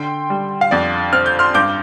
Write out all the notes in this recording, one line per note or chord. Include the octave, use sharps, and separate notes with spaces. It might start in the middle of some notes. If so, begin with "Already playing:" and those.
Already playing: D3 G5 C6
G3
F5
F2 D5
C4 F6
G6
C6 F6
G2 D6 G6